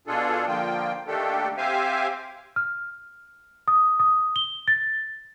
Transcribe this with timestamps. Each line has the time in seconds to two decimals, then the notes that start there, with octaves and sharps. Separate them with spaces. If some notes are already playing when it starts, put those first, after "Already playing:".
0.07 B2 D4 F4 G#4 A4
0.47 D3 F3 A#3 F4 G5
1.07 D#3 A3 A#3 D4 G4 A4
1.57 C4 G4 C5 E5 F5 G#5
2.56 F6
3.68 D#6
4.00 D#6
4.36 G7
4.68 A6